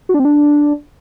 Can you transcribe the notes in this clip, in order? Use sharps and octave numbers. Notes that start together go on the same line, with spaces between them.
F#4
D4
C4
D4